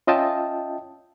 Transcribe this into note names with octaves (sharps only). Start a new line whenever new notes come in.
C#4 F4 D#5 E5 G5 A5